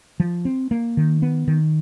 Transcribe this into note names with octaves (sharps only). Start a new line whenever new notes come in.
F3
C4
A#3
D#3
B3
D#3